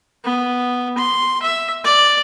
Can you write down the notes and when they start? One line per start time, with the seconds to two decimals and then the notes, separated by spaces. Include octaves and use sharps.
0.25 B3
0.97 C6
1.42 E5
1.84 D5